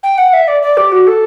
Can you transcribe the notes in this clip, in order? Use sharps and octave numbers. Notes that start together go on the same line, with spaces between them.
G5
F#5
E5
D5
D5
G4
F#4
A4